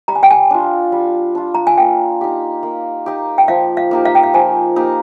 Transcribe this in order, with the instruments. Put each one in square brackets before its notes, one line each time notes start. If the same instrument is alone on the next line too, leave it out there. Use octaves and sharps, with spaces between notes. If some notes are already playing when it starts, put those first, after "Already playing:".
[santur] G3 [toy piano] A#5
[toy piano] G#5
G5
G#5
[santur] D4 F4
G3
D4 F4
[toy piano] A#5
G#5
[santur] A#3 [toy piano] G5
[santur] D#4 G4
A#3
D#4 G4
[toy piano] G5
[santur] F3 [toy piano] F5
[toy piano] F5
[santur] A#3 D#4 G4
[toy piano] F5
G5
F5
[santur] F3 [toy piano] G#5
[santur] A#3 D#4 G4